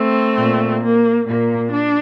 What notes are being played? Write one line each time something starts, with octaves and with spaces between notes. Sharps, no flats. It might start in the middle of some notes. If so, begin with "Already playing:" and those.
Already playing: A3 C4
A#2
A#3
A#2 A#3
D4